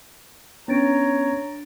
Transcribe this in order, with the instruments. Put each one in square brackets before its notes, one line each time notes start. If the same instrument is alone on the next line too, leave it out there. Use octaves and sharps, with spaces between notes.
[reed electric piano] B3 C#4 [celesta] D4 A6 D7 [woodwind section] C#5 A#5